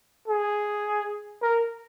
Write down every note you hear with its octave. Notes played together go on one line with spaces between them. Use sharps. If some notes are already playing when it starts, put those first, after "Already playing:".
G#4
A#4